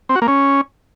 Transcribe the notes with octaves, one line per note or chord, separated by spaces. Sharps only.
C4
F#4
A#3
C#4